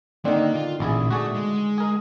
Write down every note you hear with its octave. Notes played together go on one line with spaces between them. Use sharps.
D3 D#3 A#3 C4
F4
A1 A#2 E4 G#4
A3 F#4 G#4 D5
G#3
G#4 A#4